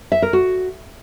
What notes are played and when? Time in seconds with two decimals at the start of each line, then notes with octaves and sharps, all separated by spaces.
0.12 E5
0.22 A#4
0.33 F#4